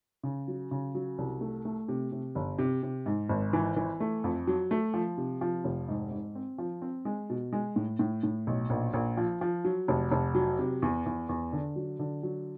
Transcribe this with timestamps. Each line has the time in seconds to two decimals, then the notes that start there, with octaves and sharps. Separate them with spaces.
0.23 C#3
0.48 F#3
0.71 C#3
0.95 F#3
1.18 C2
1.41 A3
1.65 A3
1.88 C3
2.12 C3
2.35 G1
2.58 C3
2.83 C3
3.06 G#2
3.29 G#1
3.53 E3
3.77 E3
4.00 A3
4.24 F2
4.47 F#3
4.71 A3
4.94 F3
5.17 C3
5.41 F3
5.64 F1
5.89 G#2
6.11 G#2
6.35 C4
6.58 F3
6.82 C4
7.05 G#3
7.30 B2
7.53 G#3
7.76 A2
7.99 A2
8.23 A2
8.47 B1
8.70 A#1
8.94 A#1
9.17 F3
9.41 F3
9.65 F#3
9.88 F1
10.11 F1
10.35 F#3
10.59 C3
10.82 E2
11.06 E2
11.29 E2
11.53 D3
11.76 F#3
11.99 D3
12.23 F#3